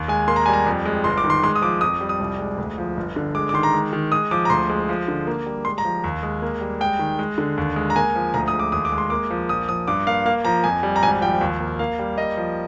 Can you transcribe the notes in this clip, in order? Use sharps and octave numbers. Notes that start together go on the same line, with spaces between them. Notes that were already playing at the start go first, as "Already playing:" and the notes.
Already playing: D#2
G#3 G#5
A#3 C6
A#5
G3 G#5
A#5
F2
G#3
G1 C6
D6
D#3
C6
G#3 C6
D#6
F3 D6
F2 D#6
G3
D#6
C2
G#3
D2
F3
G1
D3
G#3 D6
D6
D#3 C6
A#5
G#3
D#3
G#3 D#6
F3 D6
A#5
D2 C6
G#3
F3
D3
A#3
G3
G#3 C6
A#5
F3
D#2
G#3
A#3
G3
G#3 G5
D#3
G#3
D3
D#2
G#3
A#5
A#3 G#5
F3
D2 A#5
D#6
G#3
D6
D#2 D#6
D6
G#3
C6
A#3 D6
F3
A#1 D#6
F3 D#6
G2 D6
A#3 F5
A#3 F5
F3 A#5
F2 G#5
G3
A#5
G#1 G#5
F3 G5
D#2
A#3
A#3 F5
G3
A#3 D#5
F3